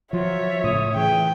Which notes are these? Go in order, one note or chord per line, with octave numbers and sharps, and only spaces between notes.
F3 F#3 F4 C#5 E5
A2 C#3 D#6
E3 G#4 G5